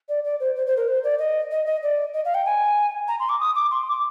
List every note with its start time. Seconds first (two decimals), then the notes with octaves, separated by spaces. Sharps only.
0.09 D5
0.24 D5
0.40 C5
0.56 C5
0.66 C5
0.77 A#4
0.87 C5
1.04 D5
1.19 D#5
1.51 D#5
1.66 D#5
1.83 D5
2.13 D#5
2.25 F5
2.34 G5
2.45 G#5
3.08 A#5
3.20 C6
3.29 D6
3.40 D#6
3.55 D6
3.71 C6
3.88 D6